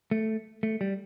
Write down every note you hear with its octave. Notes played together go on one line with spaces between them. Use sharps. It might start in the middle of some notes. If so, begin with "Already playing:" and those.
A3
A3
G3